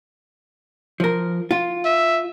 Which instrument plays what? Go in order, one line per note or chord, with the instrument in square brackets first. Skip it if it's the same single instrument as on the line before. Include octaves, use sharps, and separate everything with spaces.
[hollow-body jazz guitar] F3 A#4
F4
[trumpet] E5